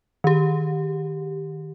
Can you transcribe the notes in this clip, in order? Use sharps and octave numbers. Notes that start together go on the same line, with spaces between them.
D#3 G4